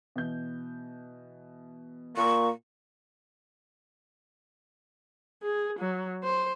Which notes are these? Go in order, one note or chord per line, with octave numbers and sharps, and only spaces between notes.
B2 E3 G6
A#2 A#3 C#6
G#4
F#3
C5